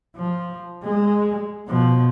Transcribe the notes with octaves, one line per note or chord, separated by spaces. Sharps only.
F3
G#3
B2 F3